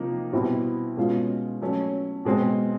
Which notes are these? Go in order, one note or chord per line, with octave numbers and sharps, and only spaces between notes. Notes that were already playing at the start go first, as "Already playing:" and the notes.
Already playing: C3 F3 A#3 D#4
B2 G3 C4 E4
B2 G#3 C#4 F4
F#3 A3 C#4
B2 G#3 C4